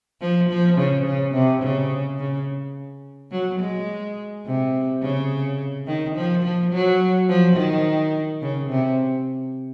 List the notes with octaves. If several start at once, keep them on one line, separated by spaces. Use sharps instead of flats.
F3
F3
C#3
C#3
C3
C#3
C#3
F#3
G#3
C3
C#3
D#3
F3
F3
F#3
F3
D#3
C#3
C3